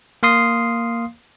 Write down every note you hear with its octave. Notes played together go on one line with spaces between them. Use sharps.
A#3 F5 C6 D#6 C7